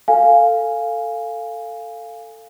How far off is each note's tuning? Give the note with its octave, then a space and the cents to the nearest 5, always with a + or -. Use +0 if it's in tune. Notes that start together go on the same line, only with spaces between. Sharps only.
A4 +15 F5 +0 G#5 +0